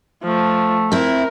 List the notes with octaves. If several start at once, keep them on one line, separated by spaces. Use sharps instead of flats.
F3 A3
C4 E4 A#4